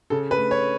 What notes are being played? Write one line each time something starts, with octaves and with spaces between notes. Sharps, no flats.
C#3 A4
B4
A3
C#5